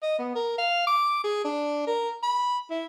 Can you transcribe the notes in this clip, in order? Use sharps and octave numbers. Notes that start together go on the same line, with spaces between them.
D#5
B3
A#4
F5
D6
G#4
D4
A#4
B5
E4